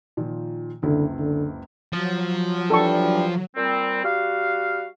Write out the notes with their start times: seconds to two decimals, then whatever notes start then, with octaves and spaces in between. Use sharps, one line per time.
0.17 A#2 D#3 F3
0.83 F#1 C#2 D3 E4
1.19 D3
1.92 F3 F#3
2.70 E3 G3 D4 A4 C#6
3.56 A#2 G3 C4
4.04 G3 F#4 F5